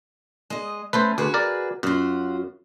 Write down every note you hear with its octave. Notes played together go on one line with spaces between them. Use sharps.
G#3 D#5
A3 C#4 B4 C5
D2 F#4 G#4 B4
A#4 D5
F#2 F4 F#4